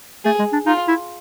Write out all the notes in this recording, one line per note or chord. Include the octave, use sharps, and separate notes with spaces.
A3 G#4
G#3
D4
D#4 F4
E4